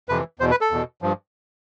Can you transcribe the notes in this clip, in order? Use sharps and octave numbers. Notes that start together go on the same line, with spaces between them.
F2 C3 E3 B4
E2 B2 C5
B4
A4
E2 B2
G2 F3